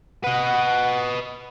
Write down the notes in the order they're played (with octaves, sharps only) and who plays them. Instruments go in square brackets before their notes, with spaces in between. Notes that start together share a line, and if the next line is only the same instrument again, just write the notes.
[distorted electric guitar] B4 D#5 [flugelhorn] F#5